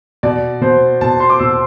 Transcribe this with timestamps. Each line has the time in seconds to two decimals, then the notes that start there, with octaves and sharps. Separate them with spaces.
0.23 B2 D5
0.61 B2 C5
1.01 B2 A5
1.20 C6
1.30 D6
1.39 B2 E6